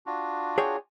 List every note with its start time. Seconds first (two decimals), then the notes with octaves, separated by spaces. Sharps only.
0.06 D4 F4 F#4
0.58 G#4 C#5 G5